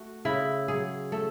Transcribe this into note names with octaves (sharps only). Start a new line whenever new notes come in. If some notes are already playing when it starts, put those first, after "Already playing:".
Already playing: A3 F#4
C#3 E4
F#3 G#4
A3 A4